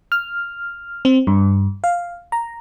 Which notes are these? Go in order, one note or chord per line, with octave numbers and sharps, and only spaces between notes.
F6
C4
G2
F5
A#5